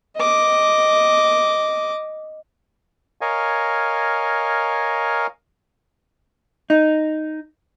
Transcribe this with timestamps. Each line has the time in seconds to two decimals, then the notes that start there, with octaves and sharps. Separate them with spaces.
0.17 D#5 D6
3.21 A#4 C#5 D#5 F5 G#5
6.70 D#4